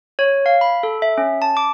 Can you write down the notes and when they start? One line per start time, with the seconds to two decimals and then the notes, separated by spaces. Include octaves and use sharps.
0.19 C#5
0.46 F5
0.61 B5
0.83 A4
1.02 E5
1.18 C#4
1.42 A5
1.57 D6